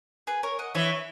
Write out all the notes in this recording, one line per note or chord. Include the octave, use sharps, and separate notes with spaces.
G#4 B4
A#4 C#5
D#5 F#5
E3 C#5 E5